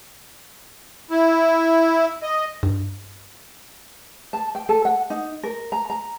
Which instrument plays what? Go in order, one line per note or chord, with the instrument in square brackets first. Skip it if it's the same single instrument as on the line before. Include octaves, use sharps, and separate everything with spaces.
[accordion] E4
D#5
[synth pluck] G2
[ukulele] A5
G5
A4
F#5
D#4
A#4
A#5
A#5